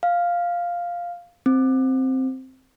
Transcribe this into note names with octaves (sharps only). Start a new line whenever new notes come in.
F5
C4